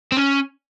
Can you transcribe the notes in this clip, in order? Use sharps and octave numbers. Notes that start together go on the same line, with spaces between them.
C4
C#4